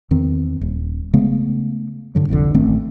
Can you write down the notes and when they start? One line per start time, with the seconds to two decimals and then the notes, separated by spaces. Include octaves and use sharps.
0.11 E2 D#3 C4
0.61 D#1
1.14 C#3 G#3 A3 B3
2.15 G2 D3 F#3
2.29 G1 C2 F2 D3
2.54 A1 D#3 A3 C4